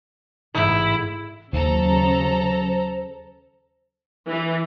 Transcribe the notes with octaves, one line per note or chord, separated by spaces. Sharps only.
A1 G#2 E4
D#2 C#3 F#3 A4 C5 A#5
E3